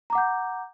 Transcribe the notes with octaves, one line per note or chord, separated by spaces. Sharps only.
F#5 A#5 D6 G6